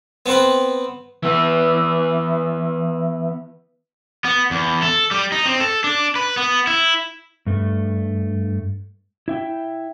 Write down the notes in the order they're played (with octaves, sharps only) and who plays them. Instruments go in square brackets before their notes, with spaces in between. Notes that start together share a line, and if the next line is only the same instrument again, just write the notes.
[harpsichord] B3 C4 B4
[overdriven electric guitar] E3 B3
B3
E2
A4
G3
D#4
C4
A4
D4
B4
B3
E4
[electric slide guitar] G2 A3
E4 E5 G5